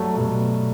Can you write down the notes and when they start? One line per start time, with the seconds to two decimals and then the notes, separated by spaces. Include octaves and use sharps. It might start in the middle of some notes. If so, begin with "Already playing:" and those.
Already playing: G2 F#3 A3
0.16 G2 B2 F#3 A3